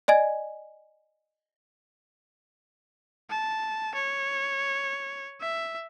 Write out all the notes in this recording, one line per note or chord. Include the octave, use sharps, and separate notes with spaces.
D5 D#5 G#5 G#6
A5
C#5
E5